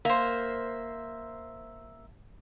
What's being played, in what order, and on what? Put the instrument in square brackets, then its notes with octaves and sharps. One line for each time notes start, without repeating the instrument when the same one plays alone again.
[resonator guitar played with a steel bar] A#3 [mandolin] C5 E5